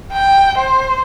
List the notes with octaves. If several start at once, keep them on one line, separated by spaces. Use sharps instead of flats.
G5
C5